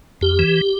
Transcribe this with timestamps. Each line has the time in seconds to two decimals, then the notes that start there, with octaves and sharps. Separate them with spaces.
0.21 F2 G4
0.39 E3